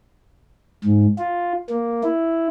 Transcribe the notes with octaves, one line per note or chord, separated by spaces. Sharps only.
G#2
F4
A#3
E4